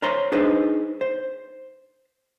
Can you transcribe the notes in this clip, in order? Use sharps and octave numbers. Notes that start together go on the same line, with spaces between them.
A#4 C5 C#5 A#5 C6
D4 D#4 G#4 B4 C5
C5